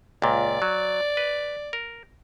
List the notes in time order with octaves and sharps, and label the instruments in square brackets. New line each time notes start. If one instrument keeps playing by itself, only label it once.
[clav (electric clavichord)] C#2 A#2 [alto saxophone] D5
[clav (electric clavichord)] F#3
B4
A#4